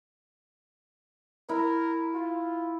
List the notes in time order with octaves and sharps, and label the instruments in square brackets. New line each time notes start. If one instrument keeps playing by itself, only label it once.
[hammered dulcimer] E4 [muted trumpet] A#4
[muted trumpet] F4